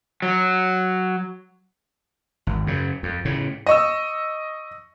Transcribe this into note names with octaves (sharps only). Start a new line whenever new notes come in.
F#3
G#1
F#2 C#3
F2
A2 C#3
D#5 C#6 E6